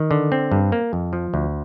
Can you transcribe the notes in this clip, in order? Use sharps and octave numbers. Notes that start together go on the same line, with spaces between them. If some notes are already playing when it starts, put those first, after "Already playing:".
Already playing: D#3
D3
C4
G2
A#3
F2
F3
D2